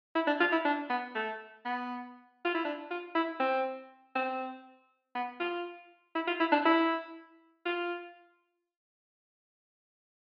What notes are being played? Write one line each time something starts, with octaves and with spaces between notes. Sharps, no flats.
E4
D4
F4
E4
D4
B3
A3
B3
F4
E4
D4
F4
E4
C4
C4
B3
F4
E4
F4
E4
D4
E4
F4